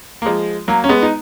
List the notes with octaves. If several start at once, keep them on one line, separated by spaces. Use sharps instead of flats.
A#3
F3 G#3
F#3 A#3
C#4
G#3 B3
D#4